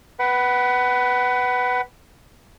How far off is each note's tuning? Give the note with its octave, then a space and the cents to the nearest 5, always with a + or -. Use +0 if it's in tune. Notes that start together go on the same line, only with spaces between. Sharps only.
B4 +0 F#5 +25